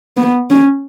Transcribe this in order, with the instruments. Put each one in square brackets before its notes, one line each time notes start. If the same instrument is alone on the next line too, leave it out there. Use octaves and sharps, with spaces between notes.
[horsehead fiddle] B3
C#4